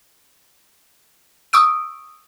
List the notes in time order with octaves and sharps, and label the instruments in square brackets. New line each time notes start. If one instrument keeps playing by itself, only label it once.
[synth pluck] C#6 D#6 E6 D7